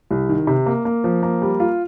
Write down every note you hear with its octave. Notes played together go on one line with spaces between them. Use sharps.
C2
D#3
C3
A#3
A#3
F3
A#3
G3
F4